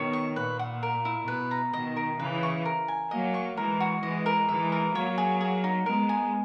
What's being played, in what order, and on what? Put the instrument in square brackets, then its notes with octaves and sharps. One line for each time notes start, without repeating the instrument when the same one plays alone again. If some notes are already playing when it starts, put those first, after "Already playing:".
Already playing: [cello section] B2 D#3 [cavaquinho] C#5
[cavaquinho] C#6
[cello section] A#2 [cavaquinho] B4
[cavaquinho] F#5
A#4
E4
[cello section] B2 [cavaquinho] B4
[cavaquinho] A#5
[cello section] B2 D#3 [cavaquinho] D#5
[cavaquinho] A#4
[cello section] C#3 E3 [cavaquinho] B4
[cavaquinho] C#6
A#4
G#5
[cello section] F#3 A#3 [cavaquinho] D#5
[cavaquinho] C#6
[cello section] E3 G#3 [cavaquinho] A#4
[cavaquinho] F#4
[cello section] E3 G#3 [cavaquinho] D#5
[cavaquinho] A#4
[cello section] E3 G#3 [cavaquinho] E5
[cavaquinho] A#4
[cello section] F#3 A#3 [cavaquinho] C#5
[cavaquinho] G#4
G#4
D#4
[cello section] G#3 B3 [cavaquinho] A#4
[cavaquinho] G#5